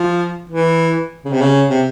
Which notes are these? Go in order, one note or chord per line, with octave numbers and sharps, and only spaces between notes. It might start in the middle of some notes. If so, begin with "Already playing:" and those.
Already playing: F3
E3
C#3
C3
C#3
C3